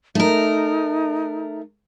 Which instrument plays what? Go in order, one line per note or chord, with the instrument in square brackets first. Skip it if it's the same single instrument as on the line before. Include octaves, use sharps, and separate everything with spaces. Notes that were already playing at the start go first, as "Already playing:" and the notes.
[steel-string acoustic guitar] A3 A#4 [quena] D#4